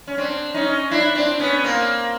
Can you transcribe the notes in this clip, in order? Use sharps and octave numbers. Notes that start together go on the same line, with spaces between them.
C#4
C4 D4
C#4 D#4
D4 E4
C4 D4
B3 C#4
A#3 C4